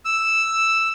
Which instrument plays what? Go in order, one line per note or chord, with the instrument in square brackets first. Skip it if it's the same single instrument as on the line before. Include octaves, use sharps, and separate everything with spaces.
[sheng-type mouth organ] E6